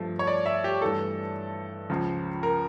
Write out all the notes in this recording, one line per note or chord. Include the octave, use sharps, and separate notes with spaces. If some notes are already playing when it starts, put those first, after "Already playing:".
Already playing: G2 F3 A3
C#5
D5
E5
G4
G2 E3 A3 A4
C#2 C#3 F3
A#4